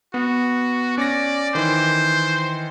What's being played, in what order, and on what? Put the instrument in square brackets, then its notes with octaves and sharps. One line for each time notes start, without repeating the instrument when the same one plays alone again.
[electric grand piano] B3 [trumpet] F#4
[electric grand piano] C#4 A#6 [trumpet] D5
[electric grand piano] D#3 E3 [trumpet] C5